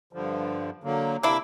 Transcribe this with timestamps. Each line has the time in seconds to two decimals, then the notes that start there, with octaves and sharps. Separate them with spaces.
0.13 G2 D3 F3
0.84 D3 F#3 A#3
1.23 C3 A#3 D4 E4 D6 E6